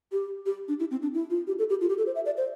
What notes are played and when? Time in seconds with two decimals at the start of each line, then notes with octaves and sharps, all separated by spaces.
0.12 G4
0.46 G4
0.68 D4
0.80 E4
0.91 C4
1.02 D4
1.14 E4
1.30 F4
1.47 G4
1.59 A4
1.70 G4
1.81 F4
1.89 G4
1.98 A4
2.07 C5
2.15 E5
2.26 D5
2.37 C5